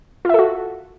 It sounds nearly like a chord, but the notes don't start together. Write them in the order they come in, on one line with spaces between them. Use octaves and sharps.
F4 E5 A4 F#4